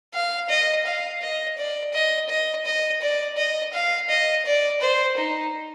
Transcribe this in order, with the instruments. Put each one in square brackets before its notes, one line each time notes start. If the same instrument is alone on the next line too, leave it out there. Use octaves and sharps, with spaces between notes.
[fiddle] F5
D#5
F5
D#5
D5
D#5
D#5
D#5
D5
D#5
F5
D#5
D5
C5
D#4